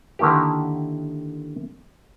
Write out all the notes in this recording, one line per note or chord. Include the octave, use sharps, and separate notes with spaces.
D3 D#3 A#3 E4 G4